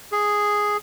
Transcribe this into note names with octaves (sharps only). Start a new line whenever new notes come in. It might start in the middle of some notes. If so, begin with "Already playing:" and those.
G#4